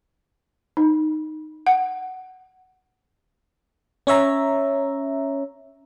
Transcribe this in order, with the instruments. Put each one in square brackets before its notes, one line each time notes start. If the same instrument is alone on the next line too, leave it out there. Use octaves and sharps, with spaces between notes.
[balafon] D#4
F#5
[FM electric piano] C#4 C#5 E5 A#5